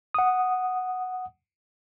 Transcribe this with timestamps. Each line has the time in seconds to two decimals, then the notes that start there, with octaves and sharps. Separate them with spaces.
0.14 F#5 D#6